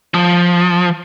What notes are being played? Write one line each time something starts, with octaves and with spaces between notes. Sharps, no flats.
F3